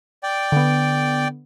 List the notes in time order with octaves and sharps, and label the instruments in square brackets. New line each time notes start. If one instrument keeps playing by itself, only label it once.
[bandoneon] D5 G5
[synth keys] D3 B3